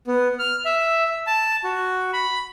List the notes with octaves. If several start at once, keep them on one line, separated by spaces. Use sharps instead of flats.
B3
F6
E5
A5
F#4
B5